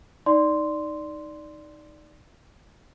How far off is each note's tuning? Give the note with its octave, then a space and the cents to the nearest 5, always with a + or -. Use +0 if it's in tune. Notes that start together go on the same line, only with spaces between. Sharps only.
D#4 +0 D5 +0 C6 -5